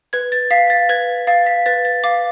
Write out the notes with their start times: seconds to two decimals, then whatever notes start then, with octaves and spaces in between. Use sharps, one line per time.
0.13 B4 G#6
0.32 A6
0.51 F5 B6
0.70 A6
0.89 B4 G#6
1.27 F5 A6
1.46 B6
1.66 B4 A6
1.85 A6
2.04 F5 D6